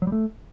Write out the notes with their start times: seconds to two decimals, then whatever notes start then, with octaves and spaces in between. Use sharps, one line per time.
0.02 F#3
0.07 G3
0.12 A3